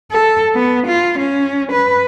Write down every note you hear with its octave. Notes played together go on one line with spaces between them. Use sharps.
A4
B3
F4
C#4
B4